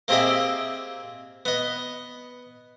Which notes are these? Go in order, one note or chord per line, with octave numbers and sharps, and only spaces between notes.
A#3 C4 G4 G#4 D#5 E5
B3 D#5